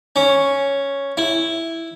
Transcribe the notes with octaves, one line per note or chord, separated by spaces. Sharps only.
C#4
E4